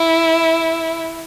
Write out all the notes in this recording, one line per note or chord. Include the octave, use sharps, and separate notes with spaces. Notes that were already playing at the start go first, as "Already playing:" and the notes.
Already playing: E4